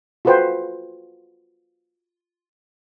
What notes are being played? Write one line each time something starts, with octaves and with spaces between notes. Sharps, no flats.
F4 F#4 A4 B4 C5 G5